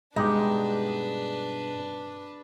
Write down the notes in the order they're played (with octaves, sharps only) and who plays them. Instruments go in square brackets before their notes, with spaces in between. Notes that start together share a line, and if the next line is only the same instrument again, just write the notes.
[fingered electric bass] G2 B2 [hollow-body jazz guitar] G#3 [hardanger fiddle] D4 B4 [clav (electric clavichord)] D#4 G4